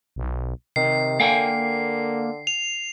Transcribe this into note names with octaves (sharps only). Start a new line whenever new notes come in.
B1
C3 D#3 C7
D3 A#3 F5 G5 G#5
F7